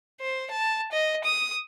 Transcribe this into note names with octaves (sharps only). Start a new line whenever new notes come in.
C5
A5
D#5
D#6